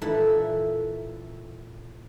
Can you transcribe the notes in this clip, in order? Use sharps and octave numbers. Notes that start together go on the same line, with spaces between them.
A#2 E3 E4 A4 E5